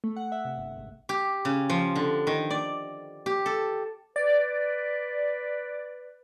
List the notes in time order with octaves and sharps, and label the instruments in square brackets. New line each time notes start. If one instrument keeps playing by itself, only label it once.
[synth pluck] A3
F#5
E5
C3
G1
G#1
[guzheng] G4
C#3
F3
D3
D#3
D5
G4
A4
[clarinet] B4 [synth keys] D5